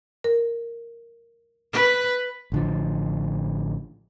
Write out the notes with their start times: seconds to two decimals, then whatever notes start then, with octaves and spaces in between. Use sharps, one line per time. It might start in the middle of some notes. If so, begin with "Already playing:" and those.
0.24 A#4
1.73 B4
2.52 A1 D3 F3